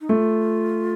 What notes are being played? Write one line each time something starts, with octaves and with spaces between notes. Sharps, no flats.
D#4
A3 F4